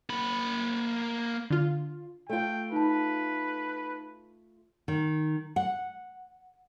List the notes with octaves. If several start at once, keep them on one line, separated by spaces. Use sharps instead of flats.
A#3 B5
D3 F4
A3 F4 G5
D#4 B4 A5
D#3
F#5